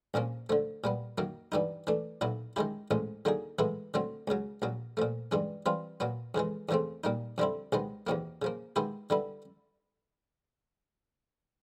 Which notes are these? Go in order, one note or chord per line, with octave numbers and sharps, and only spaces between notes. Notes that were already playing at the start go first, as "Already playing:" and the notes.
A#1 A#2 F3 A#3 C#4
D3 F3 A3
A#2 G3 B3
F#2 D#3 F#3 A#3
G2 E3 G3 B3 D#4
E3 A3 D4
B1 A#2 F#3 B3 E4
D#3 G#3 C#4 E4 G4
A1 A2 F3 G#3 C#4
D3 F#3 A#3 D#4 G#4
A2 E3 G#3 B3 E4
D3 F#3 A3 C4
C#2 C#3 F#3
A#1 A#2 F#3
A#2 F3 A3
G2 E3 G#3 C#4
E3 G3 C4 F4
A#2 F#3 B3
F2 C#3 E3 G#3
E2 C#3 F3 A3 C4
A#2 G3 A#3 D#4
F2 D3 G3 C4 E4
C2 C3 D#3 G#3 B3
E2 C3 D#3 F#3 A#3
C#3 F3 A#3
D#3 G#3 B3 E4 G4
D3 G3 B3 E4